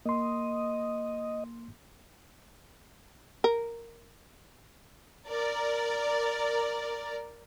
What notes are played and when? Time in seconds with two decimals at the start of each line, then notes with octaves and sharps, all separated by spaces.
0.06 A#3 D#5 C6
3.44 A#4
5.28 A#4 D5